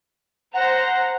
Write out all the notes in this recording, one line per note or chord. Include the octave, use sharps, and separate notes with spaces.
C5 F#5 A#5 A#6